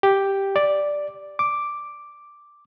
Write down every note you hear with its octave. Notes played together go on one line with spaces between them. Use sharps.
G4
D5
D6